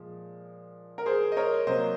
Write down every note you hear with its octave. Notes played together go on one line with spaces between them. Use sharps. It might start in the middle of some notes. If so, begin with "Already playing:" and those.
Already playing: A#2 F3 G#3
A#4
G#4 C5
D#5
A#4 C#5
C3 F#3 A#3 C5 D#5